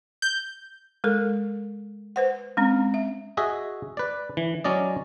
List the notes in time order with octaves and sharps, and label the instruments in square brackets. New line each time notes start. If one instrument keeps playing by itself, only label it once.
[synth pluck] G6
[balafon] G#3 A4 A#4
B4 C5 F#5
G#3 C4 C#4
E5
[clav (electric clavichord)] F#4 G#4 D#5 E5
B4 D5
E3
F#3 C#4 D5 D#5